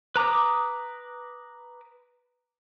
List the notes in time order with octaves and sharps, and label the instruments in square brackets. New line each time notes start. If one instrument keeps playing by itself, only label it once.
[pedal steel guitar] B4 A#5 D6 D#6